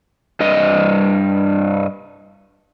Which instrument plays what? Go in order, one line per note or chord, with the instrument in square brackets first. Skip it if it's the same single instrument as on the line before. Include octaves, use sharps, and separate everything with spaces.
[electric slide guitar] G2 G3 D#5